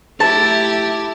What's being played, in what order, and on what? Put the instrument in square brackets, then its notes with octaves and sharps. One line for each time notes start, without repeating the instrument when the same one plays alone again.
[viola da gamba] A3 E4 G4 [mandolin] A5